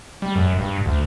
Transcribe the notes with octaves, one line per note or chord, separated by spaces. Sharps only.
G3
F#2
G2
D2